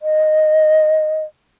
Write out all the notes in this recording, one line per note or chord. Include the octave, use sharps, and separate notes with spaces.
D#5